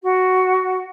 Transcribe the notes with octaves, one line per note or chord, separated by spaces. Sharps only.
F#4